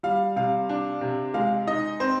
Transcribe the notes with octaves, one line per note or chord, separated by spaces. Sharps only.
G3 F5
C3 F5
D4
C3
G#3 F5
D#4 D#5
C4 C5